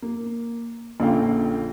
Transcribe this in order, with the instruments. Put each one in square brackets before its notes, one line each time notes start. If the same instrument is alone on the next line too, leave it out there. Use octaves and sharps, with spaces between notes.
[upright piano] A#3
A#1 A#2 D3 C#4 F5 G5